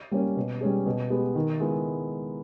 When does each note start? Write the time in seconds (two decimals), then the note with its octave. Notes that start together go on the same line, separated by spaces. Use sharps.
0.11 G3 A#3 C#4
0.36 B2
0.61 G3 C#4 G#4
0.86 B2
1.10 G#3 B3 G4
1.35 D#3
1.60 G#3 B3 E4